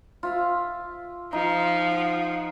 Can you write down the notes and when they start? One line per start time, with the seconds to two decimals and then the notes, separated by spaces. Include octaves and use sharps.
0.23 F4 E5 F5
1.33 F3 D#4
1.91 F#5